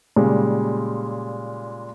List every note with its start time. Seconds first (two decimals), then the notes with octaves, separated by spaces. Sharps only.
0.16 A#2 C#3 G3 G#3